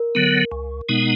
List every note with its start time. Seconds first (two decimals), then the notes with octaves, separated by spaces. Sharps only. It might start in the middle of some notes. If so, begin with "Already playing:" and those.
Already playing: A#4
0.15 D3 F#3 B3
0.52 C#2
0.89 B2 G#3 B3 D#4